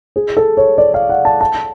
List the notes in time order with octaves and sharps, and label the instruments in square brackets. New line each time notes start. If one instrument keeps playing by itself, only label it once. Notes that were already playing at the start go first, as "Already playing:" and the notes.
[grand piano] G#4
A4
C#5
D5
F5
F#5
A5
A5